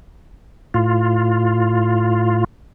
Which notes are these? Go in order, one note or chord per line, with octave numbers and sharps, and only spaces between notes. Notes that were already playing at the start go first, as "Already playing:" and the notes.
A2 F4